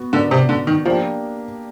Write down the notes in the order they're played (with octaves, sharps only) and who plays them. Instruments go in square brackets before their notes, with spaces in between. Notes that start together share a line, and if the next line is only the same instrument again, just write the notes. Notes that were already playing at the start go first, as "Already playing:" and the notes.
Already playing: [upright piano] B3 F#4
[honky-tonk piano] D3 [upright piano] B3 D4 F#4 A#4 D5
[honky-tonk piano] C3
D3
D#3
[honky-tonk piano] F3 [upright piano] A#3 D4 G4